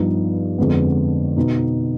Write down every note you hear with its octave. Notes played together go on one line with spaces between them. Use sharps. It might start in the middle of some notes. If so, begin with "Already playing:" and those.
Already playing: G2 F3 B3 D#4
F2 D3 G#3 B3
B2 B3 D#4